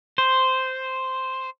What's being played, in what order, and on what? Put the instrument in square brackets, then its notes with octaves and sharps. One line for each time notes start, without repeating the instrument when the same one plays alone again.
[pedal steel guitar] C5